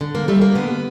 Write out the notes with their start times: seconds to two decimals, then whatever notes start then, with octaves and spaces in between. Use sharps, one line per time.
0.01 D3
0.15 A#3
0.28 G3 A3
0.41 A#3
0.55 D3 B3